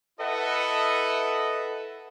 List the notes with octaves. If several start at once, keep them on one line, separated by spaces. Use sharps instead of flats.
E4 A4 B4 D#5 E5 F#5